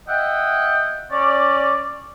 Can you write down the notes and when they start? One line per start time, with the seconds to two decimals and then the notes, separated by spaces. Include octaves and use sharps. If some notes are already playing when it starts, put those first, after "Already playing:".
0.08 D#5 E5 F#5 G5
1.11 C#4 D5